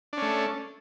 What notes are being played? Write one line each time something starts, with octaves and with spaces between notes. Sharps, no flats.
A3 C#4 D4